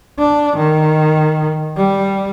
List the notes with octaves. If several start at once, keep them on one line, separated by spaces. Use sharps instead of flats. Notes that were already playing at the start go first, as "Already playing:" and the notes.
D4
D#3
G3